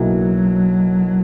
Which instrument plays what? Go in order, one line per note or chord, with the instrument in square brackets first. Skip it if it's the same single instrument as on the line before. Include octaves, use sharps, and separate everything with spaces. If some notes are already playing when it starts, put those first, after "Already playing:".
Already playing: [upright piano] B1 B2 A#3 E4 [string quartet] F#3